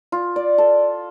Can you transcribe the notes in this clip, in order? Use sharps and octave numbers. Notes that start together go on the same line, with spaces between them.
F4
D5
A4